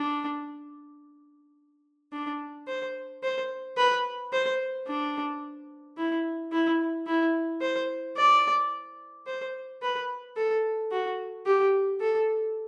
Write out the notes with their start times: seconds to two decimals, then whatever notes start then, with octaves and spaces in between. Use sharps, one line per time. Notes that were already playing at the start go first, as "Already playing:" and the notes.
Already playing: D4
2.12 D4
2.67 C5
3.23 C5
3.77 B4
4.32 C5
4.87 D4
5.97 E4
6.52 E4
7.07 E4
7.62 C5
8.17 D5
9.27 C5
9.82 B4
10.37 A4
10.92 F#4
11.46 G4
12.01 A4